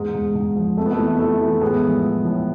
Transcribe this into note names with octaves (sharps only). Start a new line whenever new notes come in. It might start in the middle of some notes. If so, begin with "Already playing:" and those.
Already playing: E2 G#2 G#3
G#2
G#2
F3
F2 A3
B3
A3
E3
E3 A3
E3
A2 G#3 B3
F3
F3
A2